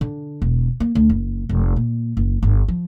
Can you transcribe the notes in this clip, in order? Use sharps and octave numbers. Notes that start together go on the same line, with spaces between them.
D3
E1
A#3
D2
F#1
F1
A#2
F#1
G1
F3